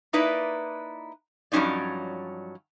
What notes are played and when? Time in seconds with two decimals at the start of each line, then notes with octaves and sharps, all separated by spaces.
0.13 A#3 D#4 E4 B4 D5
1.52 G2 F3 F#3 C#4 D#4 D5